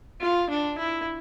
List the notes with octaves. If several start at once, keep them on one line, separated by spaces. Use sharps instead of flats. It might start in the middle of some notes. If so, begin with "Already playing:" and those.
F4
D4
E4